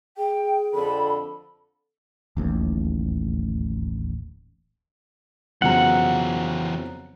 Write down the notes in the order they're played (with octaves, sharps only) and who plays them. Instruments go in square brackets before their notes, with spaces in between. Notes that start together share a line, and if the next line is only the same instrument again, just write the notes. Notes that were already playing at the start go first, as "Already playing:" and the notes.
[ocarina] G#4 [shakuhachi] G5
[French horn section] F2 D3 A4 [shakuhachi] B5
[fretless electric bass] D1 A1 D#2
[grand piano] F2 C#3 F#3 [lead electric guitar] E3 C4 [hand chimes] B3 A#5 [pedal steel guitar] F#5